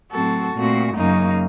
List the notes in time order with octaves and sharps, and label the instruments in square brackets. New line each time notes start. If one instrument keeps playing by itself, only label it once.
[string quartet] A2 F#3 C4 F#4 A4
A#2 A3 C4 F#4
F#2 C#3 F#3 A#3 D#4